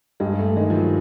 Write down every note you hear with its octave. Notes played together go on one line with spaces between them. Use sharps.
G2 G#3
A3
D#3 G#3
F3
F#3